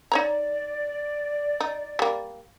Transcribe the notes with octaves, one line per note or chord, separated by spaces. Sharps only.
D#4 C#5 D5 A#5
D#4
G3 A#3